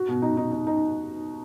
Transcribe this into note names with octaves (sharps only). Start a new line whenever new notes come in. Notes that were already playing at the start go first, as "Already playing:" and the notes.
Already playing: F#4
B2
D#4
D#4
D#4
D#4